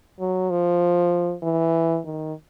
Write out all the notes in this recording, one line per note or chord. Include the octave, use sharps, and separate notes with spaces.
F#3
F3
E3
D#3